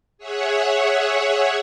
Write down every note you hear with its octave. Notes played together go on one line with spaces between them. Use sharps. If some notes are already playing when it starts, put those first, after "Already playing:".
G#4 C#5 E5 F#5